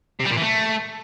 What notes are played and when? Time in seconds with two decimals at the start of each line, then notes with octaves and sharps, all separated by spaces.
0.20 C3
0.26 G3
0.31 A#2
0.37 E3
0.43 A3